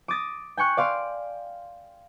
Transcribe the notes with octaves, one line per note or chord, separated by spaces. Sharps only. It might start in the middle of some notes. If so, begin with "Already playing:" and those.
D6 D#6 A6 A#6
G5 G#5 C#6 F#6
D5 F5 C6